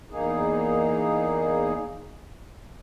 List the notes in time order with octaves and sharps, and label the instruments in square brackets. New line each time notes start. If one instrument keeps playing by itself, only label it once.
[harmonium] E2 A#3 D#4 G#4